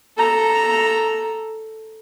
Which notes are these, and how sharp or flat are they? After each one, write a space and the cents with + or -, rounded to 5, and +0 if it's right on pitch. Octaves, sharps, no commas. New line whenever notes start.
A4 +0 A#5 +0